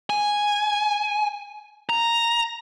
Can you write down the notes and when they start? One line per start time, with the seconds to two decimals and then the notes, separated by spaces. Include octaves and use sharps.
0.10 G#5
1.89 A#5